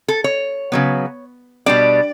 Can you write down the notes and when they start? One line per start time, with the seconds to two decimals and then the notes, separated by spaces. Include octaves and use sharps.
0.08 A4
0.24 C#5
0.72 C#3 F#3 B3
1.66 B2 G3 D4 D5